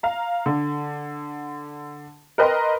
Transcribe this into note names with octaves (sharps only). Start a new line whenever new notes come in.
F5 A#5
D3
A#4 B4 D#5 G5 A#5 C6